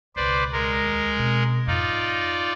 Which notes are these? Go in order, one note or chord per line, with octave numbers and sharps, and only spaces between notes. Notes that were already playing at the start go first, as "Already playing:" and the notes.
E1 C#2 B4 C5 D5
G#3 A#4
D#2
B2 C4
F2 G#2 D#4 F4 D5